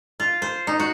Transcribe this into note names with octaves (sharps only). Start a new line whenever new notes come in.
F4
C5
D#4
F#4